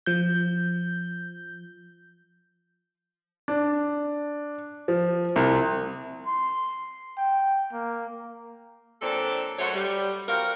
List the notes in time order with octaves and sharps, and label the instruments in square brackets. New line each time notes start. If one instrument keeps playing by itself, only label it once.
[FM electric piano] F3 G6
[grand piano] D4
F3
C2
[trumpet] C6
G5
A#3
[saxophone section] A#2 F#3 C4 D4 A4
F#2 F#3 A3 C5 C#5 F#5
G3
C4 F4 F#4 A#4